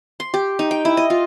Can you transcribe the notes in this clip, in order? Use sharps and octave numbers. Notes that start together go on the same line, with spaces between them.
C6
G4
D#4
G5
E4
D#5
F4